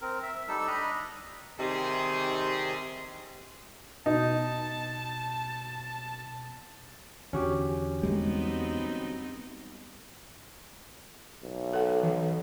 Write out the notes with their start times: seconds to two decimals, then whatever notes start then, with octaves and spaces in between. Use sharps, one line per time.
0.01 C4 A#4
0.23 E5
0.48 G3 D#4 A4 E6
0.67 D4 D#5 A#5 B5
1.60 C3 D#3 G3 D#4 G#4 C6
4.06 B2 D#4 A5
7.33 E2 D3 C#4 D4 F#4 G4
8.03 G3 G#3 B3 C4 D#4
11.43 B1
11.73 A4 F#5
12.03 E3